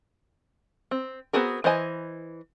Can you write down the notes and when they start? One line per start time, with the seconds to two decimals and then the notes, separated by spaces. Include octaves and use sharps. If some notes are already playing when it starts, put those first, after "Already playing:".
0.91 C4
1.33 B3 C4 F#4 G#4 A#4
1.64 E3 C5 D#5 G#5